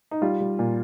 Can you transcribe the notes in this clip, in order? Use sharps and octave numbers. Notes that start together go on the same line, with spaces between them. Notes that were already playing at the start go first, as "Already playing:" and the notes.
D#4
G3 F4
G3
A#2